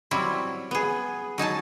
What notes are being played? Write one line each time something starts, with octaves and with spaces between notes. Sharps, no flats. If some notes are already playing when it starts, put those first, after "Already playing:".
F#3 G3 C4 E4
B3 G#4
F#3 D#4 G#5 A5